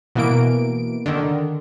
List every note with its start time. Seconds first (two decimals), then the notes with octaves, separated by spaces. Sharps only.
0.15 B2 E3 A#3 D7
1.06 D3 D#3